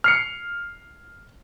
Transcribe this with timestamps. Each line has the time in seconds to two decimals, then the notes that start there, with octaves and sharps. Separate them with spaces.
0.04 F6 C7 C#7